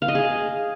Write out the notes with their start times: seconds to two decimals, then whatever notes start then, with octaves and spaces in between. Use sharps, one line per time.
0.02 F5
0.08 D#5
0.15 G#4